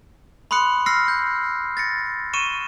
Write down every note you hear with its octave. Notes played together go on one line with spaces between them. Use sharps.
B5 C6 D#6 F#6 C#7
E6 F6 A#6 C7 C#7
G6
A6 A#6 C#7
C#6 C#7 D#7 E7